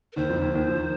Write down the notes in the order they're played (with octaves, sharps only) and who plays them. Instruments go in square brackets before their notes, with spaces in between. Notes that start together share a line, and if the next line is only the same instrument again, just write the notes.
[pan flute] A#4
[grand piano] D#2 D#3 [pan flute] C5
[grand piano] F2 F3
D#2 D#3
D#2 D#3
F3
D#3